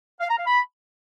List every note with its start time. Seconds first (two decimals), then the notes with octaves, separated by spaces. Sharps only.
0.21 F5
0.29 A#5
0.37 F5
0.46 B5